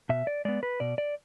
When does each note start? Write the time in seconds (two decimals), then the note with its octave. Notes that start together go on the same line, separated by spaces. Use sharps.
0.09 B2 E5
0.27 D5
0.45 G#3 B3 D5
0.63 B4
0.80 B2 D5
0.98 D5